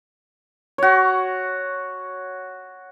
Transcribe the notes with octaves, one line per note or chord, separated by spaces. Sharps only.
F#4 C#5